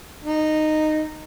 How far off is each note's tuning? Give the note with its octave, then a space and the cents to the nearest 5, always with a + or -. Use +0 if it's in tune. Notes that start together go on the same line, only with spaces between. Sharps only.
D#4 -10